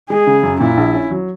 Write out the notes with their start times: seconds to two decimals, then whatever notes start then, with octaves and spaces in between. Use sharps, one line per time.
0.10 G#3 G#4
0.27 C#3
0.43 F#2
0.60 A#2 E4
0.77 A#1
0.94 C#4
1.11 F#3